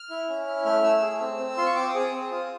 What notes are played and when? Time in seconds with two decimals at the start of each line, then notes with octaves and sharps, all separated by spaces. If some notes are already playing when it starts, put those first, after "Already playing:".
Already playing: F6
0.10 E4
0.29 C#4
0.47 E4
0.65 A3 F6
0.84 A3 E6
1.02 G#4
1.20 C4
1.39 C4
1.57 F4 C6
1.66 C#6
1.75 C4 D6
1.88 D#6
1.94 G#4
2.00 D#6
2.12 C4
2.31 F4